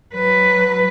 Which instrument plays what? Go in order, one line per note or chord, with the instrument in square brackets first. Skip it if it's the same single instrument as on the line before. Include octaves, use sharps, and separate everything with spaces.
[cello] F#3 B4